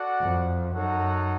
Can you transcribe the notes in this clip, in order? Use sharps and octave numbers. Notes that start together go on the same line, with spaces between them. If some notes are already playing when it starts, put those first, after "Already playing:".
Already playing: F#4 A4 D5 F#5
F2
F#2 D#4 F#4 A4 C#5 F#5